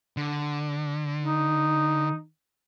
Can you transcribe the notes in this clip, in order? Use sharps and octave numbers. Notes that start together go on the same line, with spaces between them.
D3
D#4